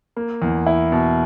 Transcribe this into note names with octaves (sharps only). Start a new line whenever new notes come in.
A#3
E2
E4
B2